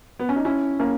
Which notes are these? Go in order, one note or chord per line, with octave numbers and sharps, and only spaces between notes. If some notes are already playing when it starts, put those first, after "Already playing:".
B3
C#4
D#4
C#4 E4
A#3 C#4